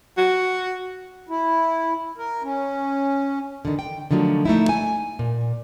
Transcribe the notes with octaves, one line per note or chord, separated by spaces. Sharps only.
F#4
E4
A#4
C#4
D3 D#3
G5
D3 D#3 F3 F#3 A3
A3 D#4 E4
G#5
A#2